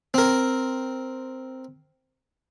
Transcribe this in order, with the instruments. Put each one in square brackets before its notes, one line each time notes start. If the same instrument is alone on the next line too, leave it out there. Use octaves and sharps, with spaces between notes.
[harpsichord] C4 A#4